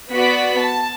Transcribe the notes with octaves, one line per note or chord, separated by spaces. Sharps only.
B3 F#4 D5 B6
A5